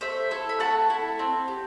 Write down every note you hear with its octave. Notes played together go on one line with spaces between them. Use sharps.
A3 C5 E5
E4 A4
B5
A3 F#5 A5
E4 A4
C4
G4